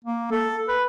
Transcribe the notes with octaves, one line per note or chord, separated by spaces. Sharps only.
A#3
A4
B4